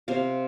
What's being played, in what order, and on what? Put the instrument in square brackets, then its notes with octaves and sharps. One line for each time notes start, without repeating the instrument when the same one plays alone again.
[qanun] C3 F5